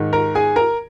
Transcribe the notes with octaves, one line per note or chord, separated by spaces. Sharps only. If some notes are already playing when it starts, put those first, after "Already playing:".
Already playing: G#2 D#3
A#4 A#5
G#4 G#5
A#4 A#5